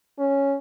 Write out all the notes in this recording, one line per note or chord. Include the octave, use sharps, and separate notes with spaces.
C#4